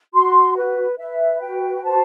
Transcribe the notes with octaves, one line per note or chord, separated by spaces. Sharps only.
F#4 C6
B4
B4 E5
F#4 G5
C5 A5